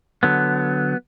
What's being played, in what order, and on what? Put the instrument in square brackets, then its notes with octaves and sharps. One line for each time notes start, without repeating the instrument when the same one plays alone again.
[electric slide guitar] D3 F#3 B3